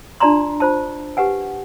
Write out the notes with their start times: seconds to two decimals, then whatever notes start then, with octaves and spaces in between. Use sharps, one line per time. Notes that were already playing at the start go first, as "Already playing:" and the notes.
0.20 D4 F4 D5 A5 A#5 C6
0.60 F4 C5 A5
1.17 G4 B4 F#5 G#5